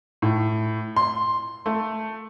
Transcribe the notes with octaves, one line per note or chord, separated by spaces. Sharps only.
A2
C6
A3